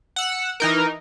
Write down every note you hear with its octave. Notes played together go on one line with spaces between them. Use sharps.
F#5 E6
E3 D#4 A#4